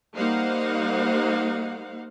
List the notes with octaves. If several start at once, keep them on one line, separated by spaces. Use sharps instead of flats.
G3 A#3 D#4 C5 F5 F#5